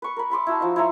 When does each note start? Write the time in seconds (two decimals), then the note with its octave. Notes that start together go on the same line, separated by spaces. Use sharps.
0.02 B4 C#6
0.16 A#4 B5
0.30 E5 B5 C6 D6
0.47 E4 F#4 A5
0.60 F3 D#4
0.76 E4 C#5 A#5 C6